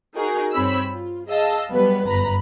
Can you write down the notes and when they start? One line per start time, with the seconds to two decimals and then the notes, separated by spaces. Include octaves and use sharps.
0.16 D#4 F#4 G#4 A#4
0.53 G2 C4 C#5 B5 E6
0.89 F4
1.27 G#4 D#5 F5 A5 E6
1.69 F#3 G3 B3 B4
2.07 G1 F#2 B4 A#5 B5